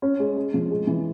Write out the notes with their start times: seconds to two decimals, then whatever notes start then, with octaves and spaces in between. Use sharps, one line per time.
0.02 C#4
0.19 G#3
0.37 G#3
0.54 F3
0.71 G#3
0.87 E3